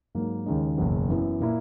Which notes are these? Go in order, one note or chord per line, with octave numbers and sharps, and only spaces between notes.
G#2 F#3 A#3
D#2 C#3 G#3 D#4
F#1 E2 B2 F#3
F#2 E3 B3 E4
A#2 A#3 E4